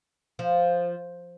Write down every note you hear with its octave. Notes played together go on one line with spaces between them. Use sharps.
F3